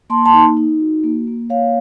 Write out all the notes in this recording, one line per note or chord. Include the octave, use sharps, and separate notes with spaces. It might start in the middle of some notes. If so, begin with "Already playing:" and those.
A#3 A5 C6
A5 C6
D#4
D#4
F#4
A#3
A#3
A#3 C#5 F5